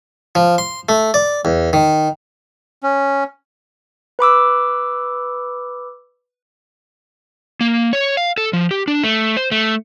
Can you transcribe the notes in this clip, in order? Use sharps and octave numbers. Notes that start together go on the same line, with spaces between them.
F3
C6
A3
D5
E2
D#3
C#4
B4 B5 D6 E6
A#3
C#5
F5
A4
F3
G4
D4
A3
C5
A3